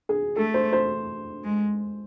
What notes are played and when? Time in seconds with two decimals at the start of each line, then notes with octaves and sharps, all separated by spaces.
0.09 G#4
0.36 A3 A4
0.54 C5
0.73 C5
1.44 G#3